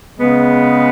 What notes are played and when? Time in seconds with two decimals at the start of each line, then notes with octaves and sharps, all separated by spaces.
0.18 C#3 G#3 B3